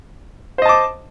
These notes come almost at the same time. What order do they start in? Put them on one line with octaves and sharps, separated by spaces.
C5 D#5 A5 D6